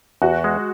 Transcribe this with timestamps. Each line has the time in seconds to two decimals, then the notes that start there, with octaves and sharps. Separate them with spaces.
0.22 E2 F#4
0.44 G#3